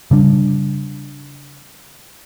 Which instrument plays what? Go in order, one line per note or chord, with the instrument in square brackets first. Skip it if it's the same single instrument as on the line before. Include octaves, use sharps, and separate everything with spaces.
[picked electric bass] C#3 G3 D4